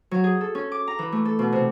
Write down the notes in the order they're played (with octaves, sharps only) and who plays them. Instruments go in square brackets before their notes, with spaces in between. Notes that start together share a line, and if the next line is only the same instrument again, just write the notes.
[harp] F#3
G#4
A4
C#4
D6
A#5
E3
A3
A4
B2
C3